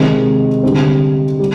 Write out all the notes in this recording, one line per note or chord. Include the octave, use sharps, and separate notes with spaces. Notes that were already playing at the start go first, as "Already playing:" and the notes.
Already playing: C3 D#3 G#3 C4
D3 G3 C4
G3